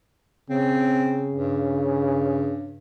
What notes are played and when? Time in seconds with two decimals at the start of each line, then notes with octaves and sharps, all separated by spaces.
0.50 C#3 C4
1.32 G2